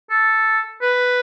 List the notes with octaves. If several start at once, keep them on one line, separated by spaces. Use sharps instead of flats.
A4
B4